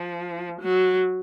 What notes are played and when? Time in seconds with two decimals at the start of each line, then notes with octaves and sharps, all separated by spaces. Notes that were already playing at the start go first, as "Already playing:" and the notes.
Already playing: F3
0.61 F#3